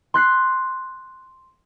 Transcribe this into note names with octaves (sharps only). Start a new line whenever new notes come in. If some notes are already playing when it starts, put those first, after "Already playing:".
C6 F#6 B6 C7